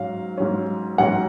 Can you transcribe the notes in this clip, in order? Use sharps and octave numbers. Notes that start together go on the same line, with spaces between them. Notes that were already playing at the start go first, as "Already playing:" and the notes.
Already playing: G#2 F#3 C#4 F5
G#2 F#3 C#4
G#2 F#3 C#4 F#5